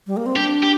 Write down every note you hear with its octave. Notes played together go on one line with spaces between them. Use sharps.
G3
A#3
C4
D4 G4
G4